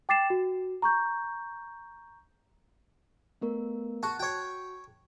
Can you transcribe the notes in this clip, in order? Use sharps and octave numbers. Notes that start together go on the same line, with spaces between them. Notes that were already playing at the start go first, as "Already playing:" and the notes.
G5 D6 A6 C7 E7
F#4
A#5 C#6 G6
A3 B3 A#4
F#4 A5 F#6
F#4 C#5 G5